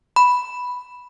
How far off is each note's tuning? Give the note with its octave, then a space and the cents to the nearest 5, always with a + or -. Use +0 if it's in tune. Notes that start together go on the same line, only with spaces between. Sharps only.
B5 +0